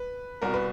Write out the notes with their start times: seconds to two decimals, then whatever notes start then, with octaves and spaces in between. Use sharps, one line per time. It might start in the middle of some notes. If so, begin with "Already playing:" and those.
Already playing: B4
0.42 C2 B2 A#4
0.54 B4